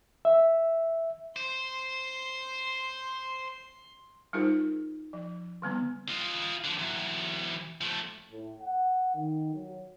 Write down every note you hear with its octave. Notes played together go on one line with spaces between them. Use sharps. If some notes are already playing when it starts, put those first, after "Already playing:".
E5
C5 C6
G3 D#4 F4 G#4 A#4 C5
F3
D3 G3 B3 C4
F4 D#5
D3 F3
E3 F#3
F3 A3
A2
F#5
D#3
F#3